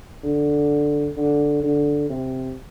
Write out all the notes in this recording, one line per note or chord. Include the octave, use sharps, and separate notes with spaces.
D3
D3
D3
C3